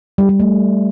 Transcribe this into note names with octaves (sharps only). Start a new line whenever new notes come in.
G3
G3
A3